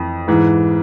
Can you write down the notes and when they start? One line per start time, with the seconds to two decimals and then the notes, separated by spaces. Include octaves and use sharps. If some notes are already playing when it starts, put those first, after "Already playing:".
Already playing: F2 E3
0.28 G#2 E3